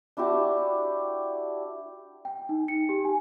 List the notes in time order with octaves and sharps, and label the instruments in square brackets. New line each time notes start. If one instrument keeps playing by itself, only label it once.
[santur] D4 E4 F#4 G4
[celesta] G5
D#4
C#7
G4
G#5